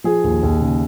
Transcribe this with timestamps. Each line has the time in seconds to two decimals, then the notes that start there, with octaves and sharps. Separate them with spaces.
0.04 F3 G#4
0.24 D#2
0.43 D#2
0.61 C#3